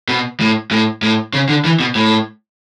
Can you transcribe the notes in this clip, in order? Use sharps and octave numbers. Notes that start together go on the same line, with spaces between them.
B2
A2
A2
A2
C#3
D3
E3
B2
A2